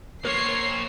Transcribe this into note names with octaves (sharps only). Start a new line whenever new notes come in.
A#3 A#4 C5 C#5 C7